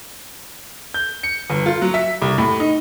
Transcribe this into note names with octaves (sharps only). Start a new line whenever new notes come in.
G6
C#7
G1
F4
F#3
E5
C2
A2
D#4